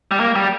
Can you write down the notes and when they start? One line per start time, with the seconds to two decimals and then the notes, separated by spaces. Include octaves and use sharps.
0.11 G3
0.20 A#3
0.36 G3